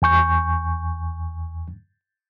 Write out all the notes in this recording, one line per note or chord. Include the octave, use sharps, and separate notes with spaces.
E2 G#5 C#6 G6